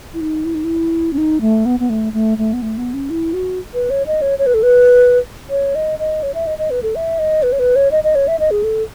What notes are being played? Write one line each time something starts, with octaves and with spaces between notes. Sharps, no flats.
E4
D#4
E4
D#4
E4
C#4
D#4
A3
B3
B3
A3
A3
A3
B3
A3
B3
C#4
E4
F#4
B4
C#5
D#5
C#5
C#5
B4
A4
B4
C#5
D#5
D#5
C#5
E5
D#5
D#5
B4
A4
E5
D#5
B4
C#5
B4
C#5
D#5
D#5
C#5
E5
D#5
G#4
A4